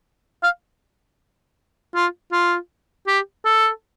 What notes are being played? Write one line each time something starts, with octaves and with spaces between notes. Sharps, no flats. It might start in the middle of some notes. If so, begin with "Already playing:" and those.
F5
F4
F4
G4
A4